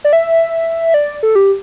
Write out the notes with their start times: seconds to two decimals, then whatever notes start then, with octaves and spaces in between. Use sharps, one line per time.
0.04 D5
0.13 E5
0.94 D5
1.23 A4
1.35 G4